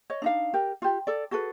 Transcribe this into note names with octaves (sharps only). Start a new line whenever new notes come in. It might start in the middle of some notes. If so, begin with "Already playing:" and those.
C#5 D#5
D4 D#4 F5
G4 A#4
F4 G4
A4 D5
F#4 G#4 A4 B4